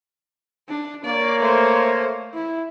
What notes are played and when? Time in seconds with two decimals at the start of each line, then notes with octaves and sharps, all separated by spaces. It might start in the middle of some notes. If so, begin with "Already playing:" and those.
0.69 D4
1.05 A#3 C#5 D5
1.39 A3 C5
2.34 E4